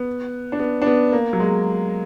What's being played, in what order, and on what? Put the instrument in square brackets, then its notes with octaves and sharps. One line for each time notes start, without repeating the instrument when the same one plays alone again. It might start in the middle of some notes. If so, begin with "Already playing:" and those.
Already playing: [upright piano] B3
D4
B3
D4
B3
A#3
F#3
G#3